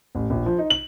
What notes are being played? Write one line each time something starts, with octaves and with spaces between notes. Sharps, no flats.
A1
A#1
F3
D#4
F#7